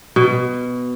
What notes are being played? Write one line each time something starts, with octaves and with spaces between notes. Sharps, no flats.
B2